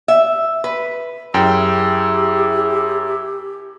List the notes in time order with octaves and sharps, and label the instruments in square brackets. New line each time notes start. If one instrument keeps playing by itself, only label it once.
[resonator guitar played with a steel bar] E5
B4
[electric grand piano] F#2 G5 [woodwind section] E4 G#4 [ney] G4 [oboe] E5